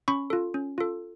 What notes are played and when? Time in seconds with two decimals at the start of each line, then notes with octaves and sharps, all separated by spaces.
0.08 C#4 B5 C#6
0.30 F4 A4
0.54 C#4
0.78 F4 A4